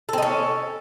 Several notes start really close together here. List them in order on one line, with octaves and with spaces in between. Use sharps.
A4 C4 D#4 C#4